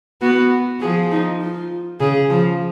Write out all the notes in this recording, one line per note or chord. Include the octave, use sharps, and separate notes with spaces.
B3 F#4
F3 G#4
D#4
F4
C#3 G#4
F3